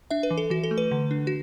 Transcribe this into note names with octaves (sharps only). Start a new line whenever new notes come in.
D4 E5
B4
E3
A4
E3 F#4
A4
A3
B4
D3
D4
F#4